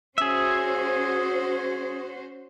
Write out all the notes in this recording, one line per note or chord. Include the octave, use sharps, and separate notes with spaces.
C#4 F#4 G#4 C5 E5